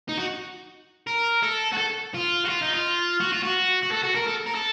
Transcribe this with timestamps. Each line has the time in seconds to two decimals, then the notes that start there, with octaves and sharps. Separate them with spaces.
0.09 D#4
0.18 F#4
1.07 A#4
1.43 A4
1.73 F#4
1.78 A4
2.14 F4
2.45 F#4
2.49 F4
2.62 D#4
2.73 F4
3.20 F#4
3.32 F4
3.43 F#4
3.83 F#4
3.92 A4
4.04 F#4
4.16 A#4
4.28 A4
4.47 A#4
4.55 A4